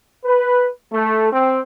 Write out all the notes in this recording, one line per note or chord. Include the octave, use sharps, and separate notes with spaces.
B4
A3
C4